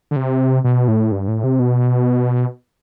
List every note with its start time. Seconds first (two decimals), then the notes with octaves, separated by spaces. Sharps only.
0.11 D3
0.16 C3
0.64 B2
0.88 A2
1.12 G2
1.28 A2
1.44 C3
1.59 B2